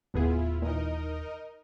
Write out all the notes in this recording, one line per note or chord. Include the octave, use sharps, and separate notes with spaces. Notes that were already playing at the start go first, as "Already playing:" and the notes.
D#1 A2 B3 E4 F4 G#4
A#2 E3 D#4 A#4 D#5